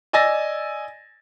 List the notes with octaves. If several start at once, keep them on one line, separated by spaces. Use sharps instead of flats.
D5 D#5 G#5 E6 A6 A#6